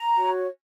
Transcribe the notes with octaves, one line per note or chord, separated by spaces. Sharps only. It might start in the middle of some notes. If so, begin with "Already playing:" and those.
Already playing: A#5
F#4 C#5